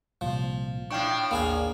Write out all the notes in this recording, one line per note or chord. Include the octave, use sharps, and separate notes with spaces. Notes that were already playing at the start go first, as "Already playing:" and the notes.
C2 A#2 F3
A2 D4 F5 G5 C#6
A1 D#2 A#3 G#4 F5